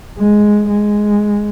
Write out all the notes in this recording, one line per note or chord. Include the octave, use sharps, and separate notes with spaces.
G#3
G#3